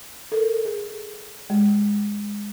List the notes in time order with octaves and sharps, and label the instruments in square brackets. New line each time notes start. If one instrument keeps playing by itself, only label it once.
[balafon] A4 A#4
G#4
G#3